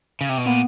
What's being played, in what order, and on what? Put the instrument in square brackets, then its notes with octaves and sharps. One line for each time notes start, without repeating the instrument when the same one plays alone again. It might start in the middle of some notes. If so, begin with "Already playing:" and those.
[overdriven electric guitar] C#3
C3
B2
[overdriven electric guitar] A#2 [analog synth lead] B3